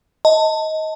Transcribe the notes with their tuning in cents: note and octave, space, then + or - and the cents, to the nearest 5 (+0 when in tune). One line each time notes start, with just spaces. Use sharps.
D#5 +20 A5 +20